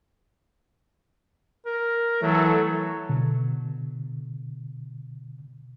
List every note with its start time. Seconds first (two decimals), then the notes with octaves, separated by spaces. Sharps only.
1.66 A#4
2.22 E3 F#3 A3 A4
3.09 B2 D3